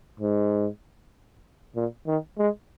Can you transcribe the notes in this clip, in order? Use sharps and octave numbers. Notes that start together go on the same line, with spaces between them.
G#2
A#2
D#3
G#3